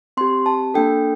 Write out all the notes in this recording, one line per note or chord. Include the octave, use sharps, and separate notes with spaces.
C4 G4 C6
A5
A#3 D4 A4 G5